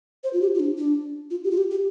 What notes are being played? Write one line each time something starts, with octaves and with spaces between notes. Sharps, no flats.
C5
F4
G4
F4
D4
D4
F4
G4
F4
G4
G4